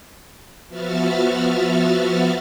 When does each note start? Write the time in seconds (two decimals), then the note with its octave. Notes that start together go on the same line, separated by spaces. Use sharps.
0.69 F3 B3 F#4 E5 F6 A6